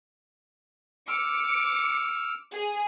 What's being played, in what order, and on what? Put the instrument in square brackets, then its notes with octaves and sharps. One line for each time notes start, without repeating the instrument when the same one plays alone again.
[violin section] D6 C#7 [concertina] E6 F6
[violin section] G#4